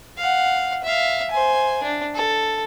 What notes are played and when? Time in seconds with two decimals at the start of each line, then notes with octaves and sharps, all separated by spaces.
0.17 F5 F#5
0.84 E5 F5
1.31 C5 G#5
1.83 D4
2.15 A4